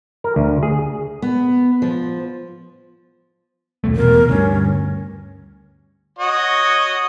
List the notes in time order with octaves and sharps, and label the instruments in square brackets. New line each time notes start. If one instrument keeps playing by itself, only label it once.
[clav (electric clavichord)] A#4
D2
G#4
[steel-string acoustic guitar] B3
F3
[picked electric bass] D#1 B1 A3
[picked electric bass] E1 G#2 B2 [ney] A#4
[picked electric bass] D2 G2 [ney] C#4
[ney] C#4
[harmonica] F#4 C#5 D#5